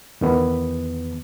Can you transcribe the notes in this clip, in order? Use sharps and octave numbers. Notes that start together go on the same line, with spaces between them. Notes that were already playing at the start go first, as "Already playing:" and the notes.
E2 D#3 B3